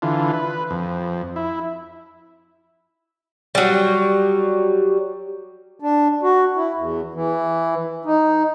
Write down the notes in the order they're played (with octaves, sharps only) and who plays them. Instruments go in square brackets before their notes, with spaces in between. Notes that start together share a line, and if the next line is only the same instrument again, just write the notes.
[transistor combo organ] D3 E3 F4
B4
F2
E4
[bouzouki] F#3 G3
[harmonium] D4
F#4
E4
E2
E3
D#4